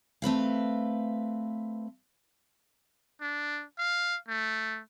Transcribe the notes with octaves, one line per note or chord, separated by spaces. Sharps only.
A3 C4 B4 F5
D4
F5
A3